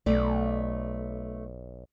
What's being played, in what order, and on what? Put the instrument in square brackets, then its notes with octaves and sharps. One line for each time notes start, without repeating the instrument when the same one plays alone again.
[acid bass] B1 [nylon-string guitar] A3 D5